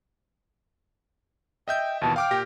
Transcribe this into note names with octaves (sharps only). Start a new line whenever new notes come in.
D#5 E5 G5 G6
D#2 B2 E3 A5
F5 G5 D6 F6
A#2 G4 A#6